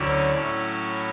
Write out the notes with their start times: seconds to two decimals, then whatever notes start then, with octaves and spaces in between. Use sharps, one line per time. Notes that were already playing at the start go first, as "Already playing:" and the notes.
Already playing: D2 D3 F#3 C#4 E4 D5
0.34 A2 F#3 C#4 E4